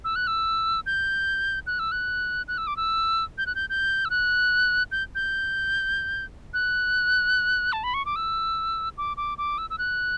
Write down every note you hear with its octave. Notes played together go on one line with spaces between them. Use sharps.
E6
F#6
E6
G6
F#6
E6
F#6
F#6
E6
D6
E6
G6
F#6
G6
G6
E6
F#6
G6
G6
F#6
A5
B5
C#6
D6
E6
D6
D6
D6
E6
E6
F#6